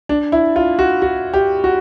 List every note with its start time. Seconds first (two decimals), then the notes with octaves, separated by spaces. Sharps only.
0.09 D4
0.32 E4
0.56 F4
0.79 F#4
1.02 F#4
1.34 G4
1.64 F#4